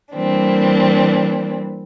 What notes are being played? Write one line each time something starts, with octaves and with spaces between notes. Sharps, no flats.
E3 G3 A#3 C4 D4